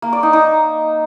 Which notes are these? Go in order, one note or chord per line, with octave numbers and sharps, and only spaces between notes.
A#3
D5
D#4
D#4